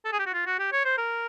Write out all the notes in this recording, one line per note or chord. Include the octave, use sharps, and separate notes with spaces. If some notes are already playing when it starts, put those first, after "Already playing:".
A4
G#4
G4
F#4
F4
F#4
G4
C#5
C5
A#4